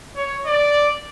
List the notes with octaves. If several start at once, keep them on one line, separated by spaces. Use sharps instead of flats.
C#5
D5